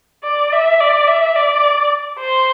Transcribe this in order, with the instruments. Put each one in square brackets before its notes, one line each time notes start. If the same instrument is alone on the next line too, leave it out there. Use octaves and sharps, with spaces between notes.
[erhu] D5
E5
D5
E5
D5
C5